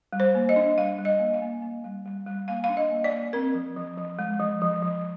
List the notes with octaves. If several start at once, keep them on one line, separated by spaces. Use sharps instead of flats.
G3
C5
A#3
D#5
D4
G3 F5
G3
D#5
A#3
F5
A#3
A#3
G3
G3
G3
A#3 F5
F5
D4
D#5
A#3
D5
A#3
C4 A#4
F3
F3
F3
G#3
F3
F3
F3